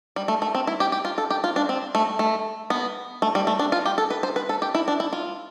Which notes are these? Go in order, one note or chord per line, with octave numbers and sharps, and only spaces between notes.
G3
A3
A3
C4
E4
G4
G4
F4
A4
G4
F4
D4
C4
A3
A3
B3
A3
G3
A3
D4
F4
G4
A4
B4
C5
B4
A4
G4
E4
D4
E4
F4